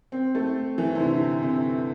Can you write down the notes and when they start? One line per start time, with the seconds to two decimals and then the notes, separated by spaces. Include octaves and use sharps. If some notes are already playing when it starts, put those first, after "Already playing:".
0.12 C4
0.35 A3
0.78 E3
0.95 C3
1.00 D3
1.42 C3